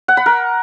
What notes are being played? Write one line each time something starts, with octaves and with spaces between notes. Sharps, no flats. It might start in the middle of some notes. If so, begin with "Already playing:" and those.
F#5
B5
A#4